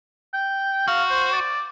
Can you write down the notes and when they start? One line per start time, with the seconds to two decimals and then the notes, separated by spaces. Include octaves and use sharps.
0.33 G5
0.88 F#4 F5
1.10 C5
1.33 D5